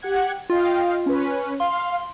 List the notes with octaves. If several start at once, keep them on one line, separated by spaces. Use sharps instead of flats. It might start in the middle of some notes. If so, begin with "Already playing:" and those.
G4 F#5 G#6
F4 D#5 F5 G5
C#4 B4
F5 C6